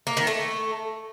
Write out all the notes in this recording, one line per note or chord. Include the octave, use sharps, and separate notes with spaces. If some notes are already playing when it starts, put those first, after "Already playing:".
A#3
D#3
A3